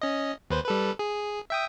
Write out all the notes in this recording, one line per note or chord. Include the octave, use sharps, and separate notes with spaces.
C#4 D#5
D#2 B4 C5
G3 A4 B4
G#4
E5 G5 D#6